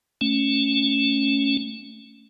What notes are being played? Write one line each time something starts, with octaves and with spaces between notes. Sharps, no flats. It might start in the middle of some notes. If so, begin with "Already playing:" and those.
A3 C#4